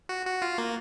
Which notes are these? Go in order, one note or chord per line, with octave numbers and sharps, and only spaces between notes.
F#4
F#4
F4
A#3